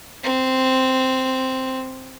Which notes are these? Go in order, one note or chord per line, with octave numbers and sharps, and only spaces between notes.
C4